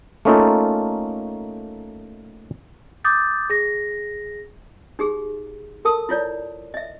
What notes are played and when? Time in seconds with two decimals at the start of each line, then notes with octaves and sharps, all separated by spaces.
0.25 A3 A#3 C#4 D#4 F4 A4
3.04 D6 D#6 G6 A6
3.50 G#4 A#6
4.99 D#4 G4 G#4
5.85 A4 A#4 A5 D#6
6.09 E4 F4 C#5 D5
6.74 D#5 E5